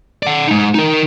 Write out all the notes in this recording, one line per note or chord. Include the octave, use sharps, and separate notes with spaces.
D5 F#5
G#3 D#4
D#4 A#4